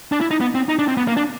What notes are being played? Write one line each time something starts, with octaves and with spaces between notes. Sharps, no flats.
D4
E4
D#4
B3
C4
D#4
D4
C4
B3
A#3
D4